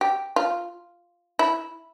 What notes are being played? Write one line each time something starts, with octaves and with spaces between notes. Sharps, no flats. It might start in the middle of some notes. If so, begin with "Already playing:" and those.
G4
F4
E4